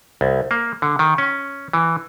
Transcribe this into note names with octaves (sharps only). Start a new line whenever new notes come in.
C2
A#3
D3
D#3
C#4
E3